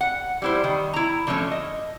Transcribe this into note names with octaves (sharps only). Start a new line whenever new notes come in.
F#5
G3 E4 C5
D#3
E4 A#5
D3 F3 A3 C4 C#4
D#5